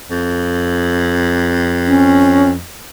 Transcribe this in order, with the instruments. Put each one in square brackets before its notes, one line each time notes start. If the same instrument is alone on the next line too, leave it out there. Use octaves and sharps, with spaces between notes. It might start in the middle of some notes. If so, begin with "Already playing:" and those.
[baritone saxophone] F2
[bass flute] C#4